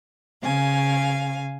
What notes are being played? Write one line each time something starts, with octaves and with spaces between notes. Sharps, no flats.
C#3 F5 G#5